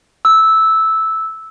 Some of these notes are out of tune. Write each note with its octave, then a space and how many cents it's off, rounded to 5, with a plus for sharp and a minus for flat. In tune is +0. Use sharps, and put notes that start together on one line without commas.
E6 -10